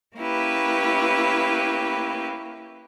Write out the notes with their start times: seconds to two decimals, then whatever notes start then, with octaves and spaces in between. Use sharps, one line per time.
0.18 A#3 C#4 E4 G4 B4